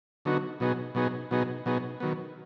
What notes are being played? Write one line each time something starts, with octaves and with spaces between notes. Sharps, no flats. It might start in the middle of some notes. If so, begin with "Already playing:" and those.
D3 F#3 B3 D#4 F#4
B2 F#3 B3 D#4 G#4
B2 F#3 B3 D#4 G#4
B2 F#3 B3 D#4 G#4
B2 F#3 B3 D#4 G#4
D#3 F#3 B3